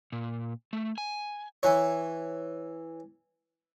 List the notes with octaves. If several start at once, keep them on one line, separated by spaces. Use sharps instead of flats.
A#2
A3
G#5
E3 C#5